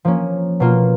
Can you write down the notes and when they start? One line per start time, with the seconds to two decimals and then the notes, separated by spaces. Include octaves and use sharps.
0.05 F3 A#3 C#4
0.60 B2 A#3 F4